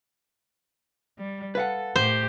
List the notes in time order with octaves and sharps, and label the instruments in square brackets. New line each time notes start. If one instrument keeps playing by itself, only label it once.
[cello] G3
[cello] A4 [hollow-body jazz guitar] B4 F5 F#5
[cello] A2 G4 [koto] C5